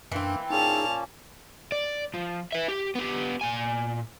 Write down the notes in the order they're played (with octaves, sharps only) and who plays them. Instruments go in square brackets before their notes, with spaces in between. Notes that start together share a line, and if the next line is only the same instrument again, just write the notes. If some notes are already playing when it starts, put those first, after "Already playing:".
[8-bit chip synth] F#2 D4 [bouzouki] E3 C4 [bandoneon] A#3
[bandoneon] A#2 A#3 C#4 [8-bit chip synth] D#4 G#4 [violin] A5 F7
[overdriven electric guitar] D5
F3
B4 E5
G4
B3 G4
A#2 G#5